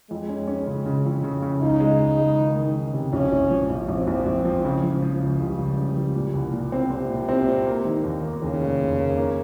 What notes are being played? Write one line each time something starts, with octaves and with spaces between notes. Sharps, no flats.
F2 G#3
C#4
C#4
C#3
C#3
F2
C#3
C#3
C#2 D#4
G#3
C#2
G#3
D#3
D#3
D#3
C3
A#1 C#4
A#1
F3
A#1
A#1 C4
A#1
A#1
F3
C#3
F3
F3
C#2
C#2 G3
C#2
C#3
F3
A#2
C2
A#2
C4
C3 C4
A#2
C4
A#2
A#3
D#3
D#2
A#3
D#2 C#3
F1
F1
A#3
A#3